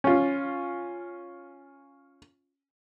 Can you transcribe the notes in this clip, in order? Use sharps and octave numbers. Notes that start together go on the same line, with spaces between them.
C#4 F4